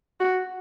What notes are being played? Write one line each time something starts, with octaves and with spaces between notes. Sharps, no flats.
F#4